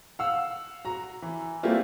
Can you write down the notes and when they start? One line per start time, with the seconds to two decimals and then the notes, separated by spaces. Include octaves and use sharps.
0.19 F5 F#5 E6
0.85 F#4 A#5
1.22 E3
1.63 G3 A3 A#3 C4 E4 F4